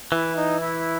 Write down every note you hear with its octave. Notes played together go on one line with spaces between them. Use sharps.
E3 E4
D#4
E4